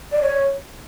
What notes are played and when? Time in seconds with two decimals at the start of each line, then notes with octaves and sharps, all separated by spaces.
0.12 D5
0.22 C#5